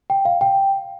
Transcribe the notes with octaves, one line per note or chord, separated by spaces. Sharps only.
G5
F5
G5